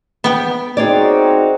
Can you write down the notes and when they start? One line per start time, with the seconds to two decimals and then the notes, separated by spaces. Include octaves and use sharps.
0.24 B3 G5
0.77 C4 D#4 F#4 G#4 C#5 D5